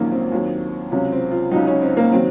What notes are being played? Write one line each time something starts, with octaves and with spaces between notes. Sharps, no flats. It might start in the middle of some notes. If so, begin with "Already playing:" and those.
Already playing: A#1 G#2 D#3 F#3 A#3 C#4
C4
D#2 D#3 F#3
C#2 C3 F#3 C#4
C4
F4
C#2 C#3 F#3 D#4
C#4
C4
A#3
D#3 F#3 C4